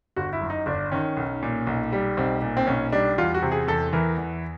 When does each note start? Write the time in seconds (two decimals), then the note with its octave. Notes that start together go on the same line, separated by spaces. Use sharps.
0.16 G1 F#4
0.33 E4
0.41 F#2
0.50 D#4
0.66 G1 D4
0.92 D#3 C#4
1.17 B1
1.43 A#2
1.67 B1
1.92 G3
2.17 B1 C4
2.42 A#2
2.57 C4
2.67 B1 C#4
2.92 G3 D4
3.18 E2 F4
3.34 F#4
3.42 C3
3.52 G#4
3.67 E2 A4
3.93 E3 A#4
4.18 E2